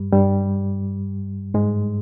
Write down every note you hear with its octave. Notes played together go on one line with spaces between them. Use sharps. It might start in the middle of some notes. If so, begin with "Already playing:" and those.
Already playing: G2 G3
G2 G3
G#2 G#3